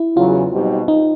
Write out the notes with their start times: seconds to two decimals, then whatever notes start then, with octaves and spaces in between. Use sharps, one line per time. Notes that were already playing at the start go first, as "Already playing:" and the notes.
Already playing: E4
0.16 E2 C#3 F#3 F4
0.52 B2 G3 C4 D#4 G4
0.88 D#4